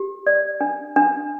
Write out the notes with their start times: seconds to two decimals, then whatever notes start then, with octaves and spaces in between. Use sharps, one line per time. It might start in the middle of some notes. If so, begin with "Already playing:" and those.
Already playing: G4
0.27 D5
0.61 D4
0.96 D4